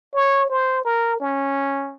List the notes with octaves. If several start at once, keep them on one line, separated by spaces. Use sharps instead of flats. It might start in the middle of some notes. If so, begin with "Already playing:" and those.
C#5
C5
A#4
C#4